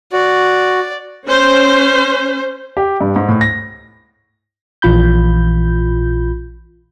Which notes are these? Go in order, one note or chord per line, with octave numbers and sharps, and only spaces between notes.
F#4 D5
C#4 C5
G4
G2
G#2
A2
A#6
A#1 E3 F4 B5 G6